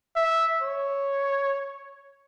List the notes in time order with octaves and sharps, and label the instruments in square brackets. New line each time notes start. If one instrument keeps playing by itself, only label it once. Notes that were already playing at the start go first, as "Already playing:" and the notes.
[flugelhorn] E5
C#5